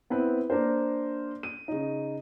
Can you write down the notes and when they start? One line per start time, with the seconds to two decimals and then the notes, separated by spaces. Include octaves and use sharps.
0.10 B3 C4 E4 B4
0.50 A#3 D4 A#4 C5
1.43 D#7
1.68 C#3 D#4